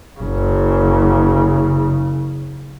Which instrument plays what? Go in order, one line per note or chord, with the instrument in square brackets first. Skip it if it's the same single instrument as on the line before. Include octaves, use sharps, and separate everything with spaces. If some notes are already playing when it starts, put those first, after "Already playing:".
[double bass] F#1 C#3